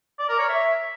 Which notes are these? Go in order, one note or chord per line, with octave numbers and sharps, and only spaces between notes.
D5
A#4
C#5
E5